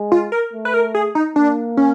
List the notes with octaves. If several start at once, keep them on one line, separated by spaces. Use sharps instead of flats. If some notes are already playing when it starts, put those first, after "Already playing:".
Already playing: G#3
F4
A#4
A3
B4
A#4
G#4
D#4
A#3 D4
C#4